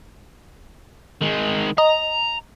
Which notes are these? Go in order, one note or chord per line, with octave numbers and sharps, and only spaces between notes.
D#3 G#3
D#5 A#5